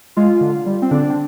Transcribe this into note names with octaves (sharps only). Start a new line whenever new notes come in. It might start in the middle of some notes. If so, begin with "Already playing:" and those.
G#3 F4
D3
G3
C4
D3 D4
C4